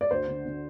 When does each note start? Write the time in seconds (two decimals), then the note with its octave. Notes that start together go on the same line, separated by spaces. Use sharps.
0.01 D5
0.11 D2 C5
0.28 D3
0.45 D3